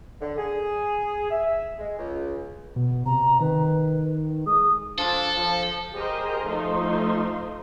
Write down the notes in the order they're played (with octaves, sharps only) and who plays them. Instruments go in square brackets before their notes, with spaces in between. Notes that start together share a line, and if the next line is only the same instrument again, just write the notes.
[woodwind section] D3
G#4
E5
G#3
C#2
[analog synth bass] B2
[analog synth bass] C3 [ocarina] A#5
[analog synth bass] D#3 [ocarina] B4
[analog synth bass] G#3 [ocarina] D#6
[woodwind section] F3 D4 [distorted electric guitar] A4
[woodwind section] F3
[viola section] G4 G#4 A#4 C5 D#5
F3 A3 D#4 C5 C6